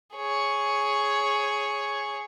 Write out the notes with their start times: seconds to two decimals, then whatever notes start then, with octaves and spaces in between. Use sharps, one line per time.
0.16 G#4 C#5